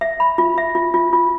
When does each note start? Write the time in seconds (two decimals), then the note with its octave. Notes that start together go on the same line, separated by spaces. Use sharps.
0.01 E5
0.20 B5
0.38 F4
0.58 E5
0.75 F4
0.94 F4
1.13 F4